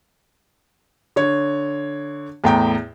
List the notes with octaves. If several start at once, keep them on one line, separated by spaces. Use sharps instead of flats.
D3 C#5
E2 A2 G5 A#5